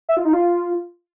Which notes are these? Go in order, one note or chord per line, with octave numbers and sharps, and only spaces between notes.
E5
F4
D#4
F4